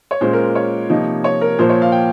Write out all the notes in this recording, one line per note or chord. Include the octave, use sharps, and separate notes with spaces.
C#5
A#2 G#3 C#4 C5
A#4
C#5
C3 F3 A#3 D#4
C#5
A#4
A#2 F3 A#3 C5
C#5
F5
G5